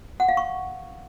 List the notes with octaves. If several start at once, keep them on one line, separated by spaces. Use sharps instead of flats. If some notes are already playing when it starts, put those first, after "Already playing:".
F#5
F5
C#6